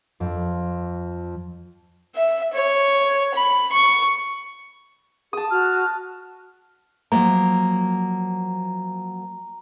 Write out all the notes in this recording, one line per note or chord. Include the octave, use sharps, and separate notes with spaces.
F2
E5
C#5
B5
C#6
G#4 A5 D#6
F#4 F6
F3 F#3 A#3 A#5